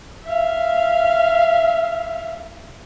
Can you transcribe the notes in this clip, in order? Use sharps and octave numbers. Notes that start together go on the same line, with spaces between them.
E5 F5